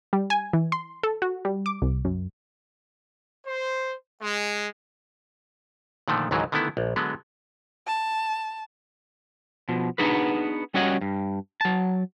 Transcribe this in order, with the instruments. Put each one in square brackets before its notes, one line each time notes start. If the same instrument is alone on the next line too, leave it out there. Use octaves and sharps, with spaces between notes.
[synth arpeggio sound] G3
G#5
E3
C6
A4
F#4
G3
D6
C2
F#2
[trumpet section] C5
G#3
[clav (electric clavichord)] A#2 D3 D#3 F3 A3
C#2 G#2 D#3 E3 F#3
D3 D#3 A3 B3 E4
A#1
D3 F#3 G#3 B3
[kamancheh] A5
[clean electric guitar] B2 F3
B3 D4 D#4 F#4 G#4 B4
G3 C#4 F#4 C#5 D#5 F#5
G2
F#3 A5